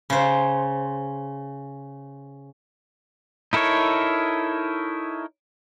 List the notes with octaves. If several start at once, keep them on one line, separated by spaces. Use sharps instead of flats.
C#3 C5
D#4 E4 A4 A#4 C#5